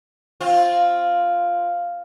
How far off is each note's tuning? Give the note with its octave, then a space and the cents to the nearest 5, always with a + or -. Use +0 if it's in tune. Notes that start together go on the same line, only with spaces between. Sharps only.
C4 +10 F4 +0